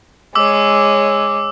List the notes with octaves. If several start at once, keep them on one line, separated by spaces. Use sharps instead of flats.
G#3 C#5 D6 E6